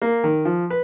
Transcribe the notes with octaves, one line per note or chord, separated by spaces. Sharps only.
A#3
D#3
F3
B4